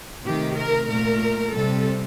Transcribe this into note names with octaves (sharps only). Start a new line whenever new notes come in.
C3 D#3 A3 G4
A#4
A#2 A3 A#4
C3 G3 A4